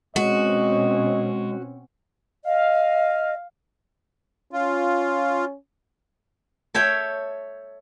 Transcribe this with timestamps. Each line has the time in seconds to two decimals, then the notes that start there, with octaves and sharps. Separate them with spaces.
0.16 B2 G#3 C4 C#4 F#4 D#5
2.45 D#5 F5
4.53 C#4 F4
6.74 A4 C#5 E5 G5